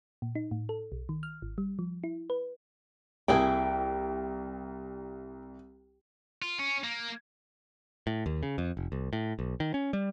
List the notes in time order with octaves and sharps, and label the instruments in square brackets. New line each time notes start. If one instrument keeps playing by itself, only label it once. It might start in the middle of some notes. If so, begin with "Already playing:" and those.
[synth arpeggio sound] A#2
D#4
A2
A4
B1
D#3
F6
G#1
G3
F3
E4
B4
[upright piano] C2 [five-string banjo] A#3 E4 G#4 [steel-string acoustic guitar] G5
[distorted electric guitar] F4
C#4
A#3
[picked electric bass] A2
D#2
C#3
F2
F1
C2
A2
B1
D#3
C#4
G3